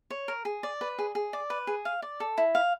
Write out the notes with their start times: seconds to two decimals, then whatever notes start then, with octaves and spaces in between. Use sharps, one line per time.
0.10 C#5
0.28 A#4
0.45 G#4
0.63 D5
0.81 B4
0.98 G#4
1.15 G#4
1.33 D5
1.50 B4
1.67 G#4
1.85 F5
2.02 D5
2.20 A4
2.38 E4
2.55 F5